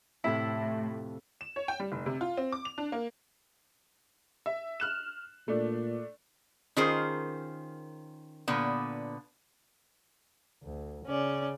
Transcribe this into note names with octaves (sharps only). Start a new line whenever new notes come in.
F2 A2 C3 A3 E4 A4
E7
C#5
G5
G3
F1
C3
F4
C4
D6
F7
D4
A#3
E5
F6 F#6 E7
A#2 A3 D4
D#3 C#4 F4 G#4 A#4 C5
A#2 D3 B3
D2
C#3 C#4 D5